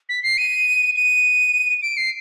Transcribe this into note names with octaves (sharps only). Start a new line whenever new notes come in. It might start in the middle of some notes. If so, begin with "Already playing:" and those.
B6
C7
D#7
D#7
D7
C7